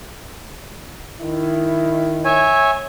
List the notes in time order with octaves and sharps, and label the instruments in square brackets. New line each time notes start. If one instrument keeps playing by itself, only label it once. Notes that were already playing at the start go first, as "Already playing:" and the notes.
[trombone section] D#3 E4
[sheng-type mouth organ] C#5 E5 G#5